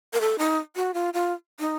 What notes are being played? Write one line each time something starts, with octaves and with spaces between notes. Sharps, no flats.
A#4
A4
D#4
F#4
F4
F4
D#4